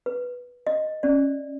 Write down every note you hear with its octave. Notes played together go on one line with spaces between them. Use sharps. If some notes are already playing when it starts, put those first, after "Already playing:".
B4
D#5
C#4 D5